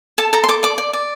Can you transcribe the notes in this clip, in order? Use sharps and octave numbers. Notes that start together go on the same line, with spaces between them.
A4 A5
A4 A#5
C6
A4 D6
D5 D6
D5
D5